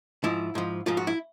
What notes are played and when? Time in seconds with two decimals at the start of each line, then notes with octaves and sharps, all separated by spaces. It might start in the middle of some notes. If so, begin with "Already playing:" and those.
0.24 G#2 F3 E4
0.55 G#2 F3
0.86 G#2 F3 F4
0.97 F#4
1.07 E4